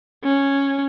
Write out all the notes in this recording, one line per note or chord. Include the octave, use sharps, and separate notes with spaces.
C#4